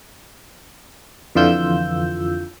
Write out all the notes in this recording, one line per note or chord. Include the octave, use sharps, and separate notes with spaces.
F2 D3 E3 F4 E6 G6